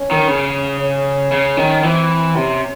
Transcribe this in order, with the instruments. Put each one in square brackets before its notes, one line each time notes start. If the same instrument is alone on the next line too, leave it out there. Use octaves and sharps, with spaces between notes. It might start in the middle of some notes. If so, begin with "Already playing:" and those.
Already playing: [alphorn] C#4
[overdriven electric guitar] D#3
C#3
[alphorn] C#4
[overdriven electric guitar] C#3
D#3
[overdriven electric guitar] E3 [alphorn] C4
[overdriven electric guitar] C3 [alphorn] C#4